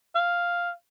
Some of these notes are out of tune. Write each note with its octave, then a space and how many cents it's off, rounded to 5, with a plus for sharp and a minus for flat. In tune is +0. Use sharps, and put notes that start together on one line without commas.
F5 +0